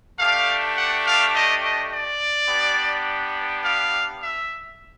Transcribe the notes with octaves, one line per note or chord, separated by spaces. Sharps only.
A3 D4 G4 F5
F#5
F5
D#5
D#5
D5
B3 D4 G4
F5
E5